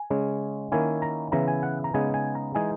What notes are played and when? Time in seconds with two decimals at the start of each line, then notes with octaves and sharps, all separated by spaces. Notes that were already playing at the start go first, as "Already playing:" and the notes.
Already playing: G#5
0.10 C#3 G#3 C#4
0.72 D#3 A#3 C#4 E4 G#5
1.02 A#5
1.32 C#3 E3 B3 E4 A#5
1.48 G#5
1.63 F#5
1.84 A#5
1.94 C#3 G#3 B3 D#4 G#5
2.14 G#5
2.35 A#5
2.55 E3 G#3 D#4 G#5